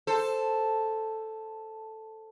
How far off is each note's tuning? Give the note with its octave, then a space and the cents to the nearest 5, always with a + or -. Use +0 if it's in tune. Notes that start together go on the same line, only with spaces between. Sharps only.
A4 +0 C5 +0